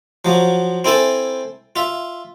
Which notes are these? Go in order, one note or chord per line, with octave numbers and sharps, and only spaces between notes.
F3 F#3
C4 E4 A4 G#5 A5
F4 E5